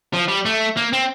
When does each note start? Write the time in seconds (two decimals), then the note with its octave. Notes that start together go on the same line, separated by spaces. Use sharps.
0.14 F3
0.28 G3
0.45 A3
0.77 A#3
0.93 C4